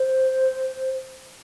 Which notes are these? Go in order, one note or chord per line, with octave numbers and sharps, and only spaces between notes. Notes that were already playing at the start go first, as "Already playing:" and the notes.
Already playing: C5